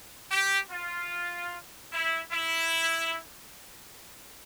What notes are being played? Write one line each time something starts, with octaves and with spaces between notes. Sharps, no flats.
G4
F4
E4
E4